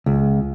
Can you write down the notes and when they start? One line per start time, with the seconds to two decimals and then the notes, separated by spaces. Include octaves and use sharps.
0.06 C#2